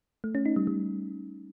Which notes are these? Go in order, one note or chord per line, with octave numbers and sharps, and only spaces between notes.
A3
C#4
D#4
G3
G3